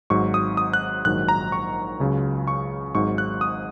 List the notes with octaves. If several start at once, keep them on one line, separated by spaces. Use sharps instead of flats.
G#1 G#2 F#3 C#6
D#6
D#6
F#6
A#1 G#2 D#3 F#3 F#6
A#5
C#6
C#2 C#3 F#3
C#6
G#1 G#2 F#3 C#6
F#6
D#6